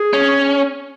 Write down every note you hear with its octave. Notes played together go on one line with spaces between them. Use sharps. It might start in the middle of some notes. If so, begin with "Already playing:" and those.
Already playing: G#4
C#4